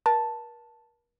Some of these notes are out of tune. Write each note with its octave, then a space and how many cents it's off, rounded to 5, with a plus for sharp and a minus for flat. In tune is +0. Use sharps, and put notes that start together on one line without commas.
A#4 +40 A5 +0